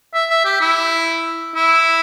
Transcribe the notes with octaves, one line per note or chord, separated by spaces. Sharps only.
E5
E5
G4
E4
E4